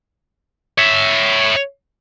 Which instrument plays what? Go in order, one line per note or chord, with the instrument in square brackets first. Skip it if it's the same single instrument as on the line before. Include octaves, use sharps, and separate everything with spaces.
[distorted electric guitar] C#5 E5